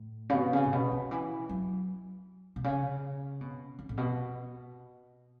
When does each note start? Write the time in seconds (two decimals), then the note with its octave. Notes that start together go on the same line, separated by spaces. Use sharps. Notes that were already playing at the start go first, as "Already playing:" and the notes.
Already playing: A2
0.30 C#3
0.34 B2
0.53 C#3
0.64 A2
0.73 B2
0.92 D#3
1.11 E3
1.49 F#3
2.56 B2
2.64 C#3
3.41 B2
3.79 D#3
3.89 A2
3.98 B2